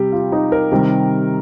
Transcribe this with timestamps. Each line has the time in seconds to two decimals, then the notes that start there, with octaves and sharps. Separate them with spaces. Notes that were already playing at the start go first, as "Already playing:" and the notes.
Already playing: C3 G3 G4
0.12 F4
0.32 D#4
0.52 A#4
0.72 C3 D#3 G3